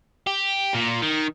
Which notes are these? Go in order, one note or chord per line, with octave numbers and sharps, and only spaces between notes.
G4
A#2
D#3